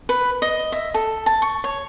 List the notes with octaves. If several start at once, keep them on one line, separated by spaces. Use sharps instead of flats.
B4
D#5
E5
A4
A5
C#6
C#5